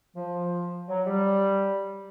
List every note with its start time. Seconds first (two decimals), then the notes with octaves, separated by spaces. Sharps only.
0.16 F3
0.88 F#3
1.06 G3